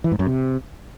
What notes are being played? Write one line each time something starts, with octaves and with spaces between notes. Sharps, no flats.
E3
G#2
F#2
C3